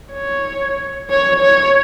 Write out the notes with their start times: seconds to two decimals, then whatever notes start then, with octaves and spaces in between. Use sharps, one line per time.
0.12 C#5
1.10 C#5
1.42 C#5